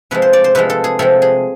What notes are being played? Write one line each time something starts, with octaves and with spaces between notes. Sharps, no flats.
C3 F3 G#3 B4
C5
D5
C5
C3 F3 G#3 B4
A4
G#4
C3 F3 G#3 A4
G#4